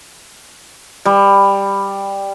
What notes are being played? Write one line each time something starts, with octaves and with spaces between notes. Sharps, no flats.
G3